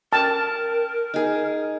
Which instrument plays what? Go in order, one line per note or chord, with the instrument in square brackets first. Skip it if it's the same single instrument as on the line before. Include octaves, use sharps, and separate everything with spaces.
[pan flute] A#4 [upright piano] G5 F6 [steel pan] A5
[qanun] D#4 G#4